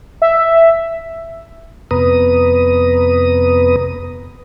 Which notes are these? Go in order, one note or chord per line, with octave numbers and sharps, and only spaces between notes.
E5
F2 C3 B3 B4 A#5 D#6